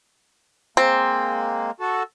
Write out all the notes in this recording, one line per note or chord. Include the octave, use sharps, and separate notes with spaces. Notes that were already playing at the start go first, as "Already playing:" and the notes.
G#3 A#3 C4
F#4 A4